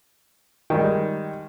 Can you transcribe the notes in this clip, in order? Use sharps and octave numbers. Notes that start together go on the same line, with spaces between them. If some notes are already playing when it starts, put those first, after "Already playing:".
D#3 G3 G#3